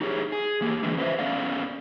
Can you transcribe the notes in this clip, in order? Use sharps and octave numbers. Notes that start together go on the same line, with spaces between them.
D#4 G4 G#4 C#5
G#4
E2 A#3 G4
E2 D3 E3 G#3
C#4 B4 C5 E5
B3 C#4 A4 D5 F5